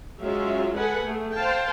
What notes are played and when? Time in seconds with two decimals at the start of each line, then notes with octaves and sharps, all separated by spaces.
0.22 F#3 G#3 C#4 F4 E5
0.74 G#3 A4 B4 F#5 G#5
1.03 A3 G#4
1.35 C5 F5 G5 A5